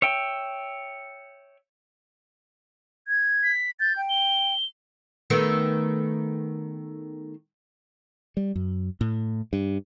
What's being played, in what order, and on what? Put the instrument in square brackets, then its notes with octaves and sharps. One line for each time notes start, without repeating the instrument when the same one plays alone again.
[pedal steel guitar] C#5 E5 G5
[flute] G#6
[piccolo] B6
[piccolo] G6 [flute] A6
[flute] G5
[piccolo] G7
[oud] D#3 A3 B3
[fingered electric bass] G3
F#2
A2
G2